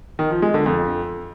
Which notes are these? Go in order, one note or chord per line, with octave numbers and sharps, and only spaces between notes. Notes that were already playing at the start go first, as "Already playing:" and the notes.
D#3
F3
G#3
D3
F2